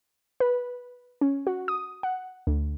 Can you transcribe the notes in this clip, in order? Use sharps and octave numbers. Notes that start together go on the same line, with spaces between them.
B4
C#4
F#4
D#6
F#5
D2